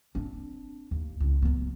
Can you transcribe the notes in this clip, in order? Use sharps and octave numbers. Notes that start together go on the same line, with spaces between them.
C4 D4
D#2
C#2
F#3 B3